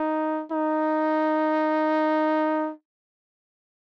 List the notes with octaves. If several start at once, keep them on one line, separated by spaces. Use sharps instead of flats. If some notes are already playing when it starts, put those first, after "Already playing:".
Already playing: D#4
D#4